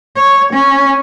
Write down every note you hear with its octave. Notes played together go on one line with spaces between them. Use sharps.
C#5
C#4